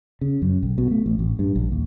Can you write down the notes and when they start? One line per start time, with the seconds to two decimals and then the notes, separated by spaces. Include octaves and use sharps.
0.21 C#3
0.42 F#2
0.63 B1
0.78 B2
0.91 A3
1.06 A1
1.19 A1
1.39 G2
1.56 A#1
1.72 D#2